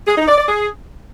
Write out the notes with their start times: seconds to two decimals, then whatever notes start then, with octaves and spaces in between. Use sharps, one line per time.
0.07 G#4
0.18 D#4
0.28 D5
0.38 D5
0.48 G#4